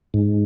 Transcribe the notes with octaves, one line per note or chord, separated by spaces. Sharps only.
G#2